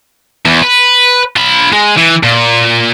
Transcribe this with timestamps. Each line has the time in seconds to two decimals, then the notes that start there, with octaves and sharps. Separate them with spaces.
0.46 E2
0.63 B4
1.36 F4 B5
1.72 G#3
1.97 E3
2.23 A#2